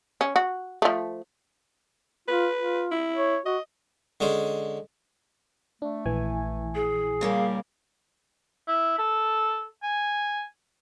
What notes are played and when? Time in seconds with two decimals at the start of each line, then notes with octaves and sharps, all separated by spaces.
0.21 C#4
0.36 F#4
0.82 F3 A3
2.28 F4 B4
2.57 F4
2.91 E4
3.16 C#5
3.46 F#4 D#5
4.20 D3 G#3 C#4 C5
5.82 A3 D4
6.06 A#1 E3 G#5
6.75 G#4
7.21 A#2 C#3 G3 A#3
8.68 E4
8.98 A4
9.83 G#5